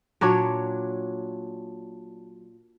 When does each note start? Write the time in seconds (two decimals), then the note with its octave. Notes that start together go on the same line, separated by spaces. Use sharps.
0.21 A#2 F#3 D4 C#5